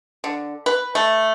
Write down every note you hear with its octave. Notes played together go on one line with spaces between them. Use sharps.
D3
B4
A3